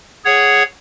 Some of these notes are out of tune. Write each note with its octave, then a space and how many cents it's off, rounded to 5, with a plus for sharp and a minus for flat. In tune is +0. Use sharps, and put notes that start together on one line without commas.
G#4 +0 C#5 +0 F#5 +0